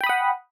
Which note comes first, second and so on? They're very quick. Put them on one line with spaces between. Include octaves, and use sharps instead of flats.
G5 B5 D#6 F#5